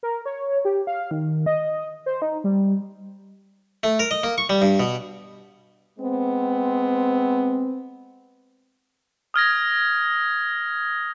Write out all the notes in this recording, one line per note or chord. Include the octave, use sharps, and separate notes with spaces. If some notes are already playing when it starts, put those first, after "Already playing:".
A#4
C#5
G4
F5
D#3
D#5
C5
D#4
G3
A3
A#4
D#5
A#3
C#6
G3
G2
B2
G#3 B3 C4
D#6 F6 G#6 A#6